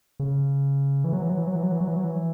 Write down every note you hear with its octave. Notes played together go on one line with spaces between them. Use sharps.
C#3
E3
F#3
E3
F#3
E3
F#3
E3
F#3
E3
F#3
E3
F#3
E3